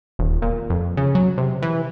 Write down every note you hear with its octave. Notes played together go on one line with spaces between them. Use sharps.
D#1
A#2
F2
C#3
F#3
C3
E3